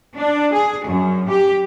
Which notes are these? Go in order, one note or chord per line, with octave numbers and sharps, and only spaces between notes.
D4
G#4
F#2
G4